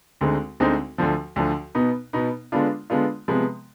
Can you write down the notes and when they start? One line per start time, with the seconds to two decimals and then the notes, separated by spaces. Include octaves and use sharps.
0.21 D2 D3 G#3 C4 D#4
0.60 D2 D3 G#3 C4 D#4
0.98 D2 D3 F3
1.36 D2 D3 F3
1.75 B2 B3 D#4
2.13 B2 B3 D#4
2.52 D3 G#3 B3 D4 F4
2.90 D3 G#3 B3 D4 F4
3.28 C3 F3 G#3 B3